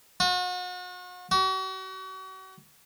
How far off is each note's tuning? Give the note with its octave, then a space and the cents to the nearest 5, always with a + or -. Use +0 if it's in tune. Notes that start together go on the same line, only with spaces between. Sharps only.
F#4 -40
F#4 +40